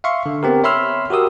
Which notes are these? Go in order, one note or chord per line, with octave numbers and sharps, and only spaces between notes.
E5 F5 C6 C#6
D3
B3 C4 G4 A#4
C#5 E5 B5 C6 E6 F6
F#4 G4 A#4 D#6 E6